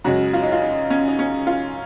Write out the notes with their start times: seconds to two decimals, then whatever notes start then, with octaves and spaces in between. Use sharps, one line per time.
0.04 F#2 C#3 G#3 F#4
0.33 F4
0.43 D#4
0.52 F4
0.62 D#4
0.90 C#4
1.08 D#4
1.19 C#4
1.47 F4